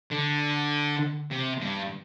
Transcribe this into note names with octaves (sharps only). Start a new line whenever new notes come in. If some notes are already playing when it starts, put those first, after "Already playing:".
D3
C3
G2